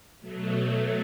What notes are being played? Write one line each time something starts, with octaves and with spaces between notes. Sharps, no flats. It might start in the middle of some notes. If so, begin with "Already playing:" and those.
B2 F#3 A3